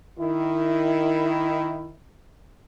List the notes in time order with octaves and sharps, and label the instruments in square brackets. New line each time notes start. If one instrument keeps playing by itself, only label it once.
[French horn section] D#3 E4